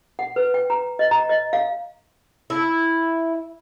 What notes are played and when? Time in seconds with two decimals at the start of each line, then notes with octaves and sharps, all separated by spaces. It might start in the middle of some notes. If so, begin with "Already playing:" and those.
0.19 F#5
0.36 B4
0.54 G5
0.70 A#5
0.99 D#5
1.11 A#5
1.29 D#5
1.53 F5
2.50 E4